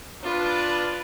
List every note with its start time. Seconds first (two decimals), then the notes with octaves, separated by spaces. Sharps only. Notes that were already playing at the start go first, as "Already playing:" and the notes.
0.23 B3 D4 F4 B4